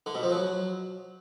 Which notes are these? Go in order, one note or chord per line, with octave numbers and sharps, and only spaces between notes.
D3
B2
F3
F#3